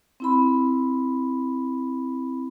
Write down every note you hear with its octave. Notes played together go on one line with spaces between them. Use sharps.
C4 E4 B5